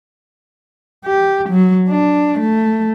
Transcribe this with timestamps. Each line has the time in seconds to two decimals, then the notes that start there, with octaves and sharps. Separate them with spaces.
1.06 G4
1.50 F#3
1.89 D4
2.40 A3